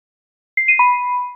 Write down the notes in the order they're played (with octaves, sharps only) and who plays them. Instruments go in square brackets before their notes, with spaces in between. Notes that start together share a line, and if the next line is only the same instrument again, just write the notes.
[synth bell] C7
D#7
B5